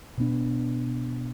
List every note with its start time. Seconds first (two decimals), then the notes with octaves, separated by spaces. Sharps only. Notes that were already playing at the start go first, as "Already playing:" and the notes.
0.18 B2 B3 D4